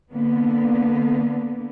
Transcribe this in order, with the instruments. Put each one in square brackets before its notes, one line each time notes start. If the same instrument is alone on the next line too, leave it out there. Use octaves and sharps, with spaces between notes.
[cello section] D3 A#3 B3